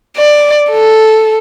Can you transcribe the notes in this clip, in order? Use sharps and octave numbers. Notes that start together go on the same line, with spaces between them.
D5
A4